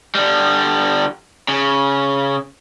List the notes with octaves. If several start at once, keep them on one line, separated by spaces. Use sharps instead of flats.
D3 G3
C#3